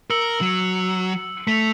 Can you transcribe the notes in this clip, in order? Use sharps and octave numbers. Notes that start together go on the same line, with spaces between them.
A#4 E6 C#7 F#7
F#3
A3 B6 F7